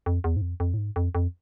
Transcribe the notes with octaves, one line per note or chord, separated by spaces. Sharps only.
F2
E2
G#2
F2
F2
A2
G#2
F2
F2